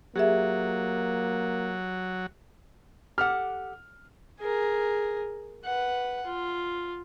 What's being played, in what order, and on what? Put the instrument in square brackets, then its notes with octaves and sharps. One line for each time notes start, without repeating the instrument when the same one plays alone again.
[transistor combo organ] F#3 [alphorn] A#3 [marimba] G4 G#4 E5
[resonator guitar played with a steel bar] G4 A4 F#5 [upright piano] F6
[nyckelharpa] G#4 A#4
B4 F#5
F4